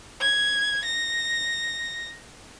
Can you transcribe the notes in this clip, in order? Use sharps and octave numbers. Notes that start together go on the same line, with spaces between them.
G#6
A#6